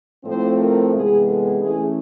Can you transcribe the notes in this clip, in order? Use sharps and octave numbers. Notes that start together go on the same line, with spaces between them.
A2 F3 A3 C4 C5
A#4
C3 E3 G#3 B3 G#4
A4
E3 A3 C#4 G#4